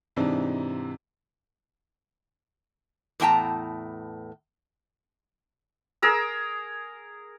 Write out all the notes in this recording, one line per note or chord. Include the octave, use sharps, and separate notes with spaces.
G#2 C3 E3 C4 D4 D#4
E2 A2 B3 G5 A5 A#5
G#4 A#4 A#5 E6